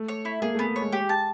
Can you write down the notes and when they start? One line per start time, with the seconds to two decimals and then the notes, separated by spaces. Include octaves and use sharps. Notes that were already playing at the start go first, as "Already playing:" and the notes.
Already playing: A3
0.08 C#5
0.25 E4
0.42 A#3 G#4
0.55 A3
0.59 B3
0.76 G#3 C#5
0.92 G4
1.09 A5